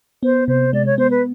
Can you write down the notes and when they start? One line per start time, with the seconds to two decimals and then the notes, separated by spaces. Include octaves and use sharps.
0.23 B3 C5
0.48 C3 C5
0.73 G#3 D5
0.86 C#5
0.98 B3 C5
1.10 B4